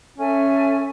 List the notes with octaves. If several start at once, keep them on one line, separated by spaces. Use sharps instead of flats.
C#4 A4 E5 G#5